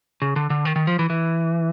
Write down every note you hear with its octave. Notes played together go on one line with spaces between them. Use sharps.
C#3
D3
D3
D#3
D#3
F3
E3
E3